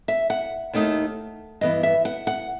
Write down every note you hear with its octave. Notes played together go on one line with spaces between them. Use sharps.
E5
F#5
D#2 D#3 A3 D#4
G2 E3 B3 D#5
E5
F#5
F#5